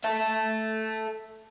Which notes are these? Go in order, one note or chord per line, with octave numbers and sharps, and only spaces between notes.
A4 E5